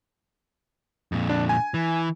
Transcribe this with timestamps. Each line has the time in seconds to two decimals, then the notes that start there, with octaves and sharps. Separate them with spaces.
1.12 F2 A#2
1.29 D4
1.49 G#5
1.74 E3